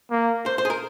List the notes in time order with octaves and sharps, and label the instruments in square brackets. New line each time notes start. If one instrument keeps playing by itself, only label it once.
[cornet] A#3
[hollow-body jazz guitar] C5
C5
G#4
A#4